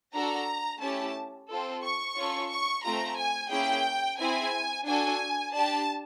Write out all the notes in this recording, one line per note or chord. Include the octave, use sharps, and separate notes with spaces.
D4 F#4 A4 A#5
A3 C#4 E4 G4 A5
C4 F4 A4
C#6
C#4 F4 A4
C#6
A3 C4 F4 A#5
G#5
A#3 C#4 E4 G#4 G5
C4 E4 G#4 G#5
D4 F#4 A4 G#5
D4 G4 A5